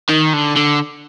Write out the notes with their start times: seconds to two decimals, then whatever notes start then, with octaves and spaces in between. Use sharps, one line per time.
0.09 D#3
0.33 D3
0.57 D3